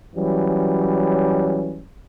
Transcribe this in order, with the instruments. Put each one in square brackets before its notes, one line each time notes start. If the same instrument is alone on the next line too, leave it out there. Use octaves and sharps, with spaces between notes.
[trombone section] E3 F#3 G3 C#4